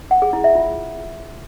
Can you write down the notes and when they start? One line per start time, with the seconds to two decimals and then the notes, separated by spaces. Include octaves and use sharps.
0.11 F#5
0.22 G#4
0.33 E4
0.44 E5
0.55 F4